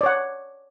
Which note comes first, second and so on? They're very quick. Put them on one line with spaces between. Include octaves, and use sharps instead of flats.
D5 C#5 F#5